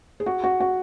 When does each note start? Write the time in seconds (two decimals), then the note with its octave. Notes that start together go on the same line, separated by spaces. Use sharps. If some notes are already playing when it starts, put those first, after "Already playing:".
0.20 G#4
0.26 F#4
0.44 F#4
0.60 F#4